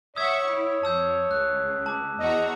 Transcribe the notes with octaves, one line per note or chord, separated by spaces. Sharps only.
C#5 E5 F#5 C#6 D#6 E6 G#6
E4
F2 A5 E6 G6
C#2 F#6
A5 D6
E2 F#4 D#5 A#5